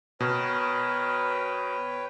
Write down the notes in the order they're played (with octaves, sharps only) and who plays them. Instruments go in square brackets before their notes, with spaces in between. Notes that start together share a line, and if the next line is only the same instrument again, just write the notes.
[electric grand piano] B2 [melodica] A#4 [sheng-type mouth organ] B4 C#5 G5